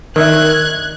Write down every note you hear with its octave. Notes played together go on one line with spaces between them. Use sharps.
D#3 A#4 D5 E5 F#6 G#6